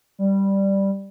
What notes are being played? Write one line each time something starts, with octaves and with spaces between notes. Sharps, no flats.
G3